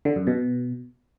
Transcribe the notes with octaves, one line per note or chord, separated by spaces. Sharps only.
D3
F#2
B2